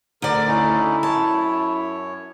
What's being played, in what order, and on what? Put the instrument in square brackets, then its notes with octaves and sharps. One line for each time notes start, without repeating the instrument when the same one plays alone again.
[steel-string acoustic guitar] D2 D5 [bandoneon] D3 A#4
[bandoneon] D3 C#4 D#4 [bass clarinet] E4
[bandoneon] F#2 C#5 [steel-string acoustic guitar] A5